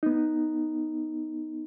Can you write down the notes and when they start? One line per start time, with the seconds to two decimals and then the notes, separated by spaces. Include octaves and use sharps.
0.03 B3 D#4